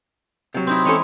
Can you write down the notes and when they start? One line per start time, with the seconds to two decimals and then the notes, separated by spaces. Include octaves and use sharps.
0.54 C3 F#3
0.67 C4 D#4 E4
0.85 E2 G#3 C4 C#4 A4 C#5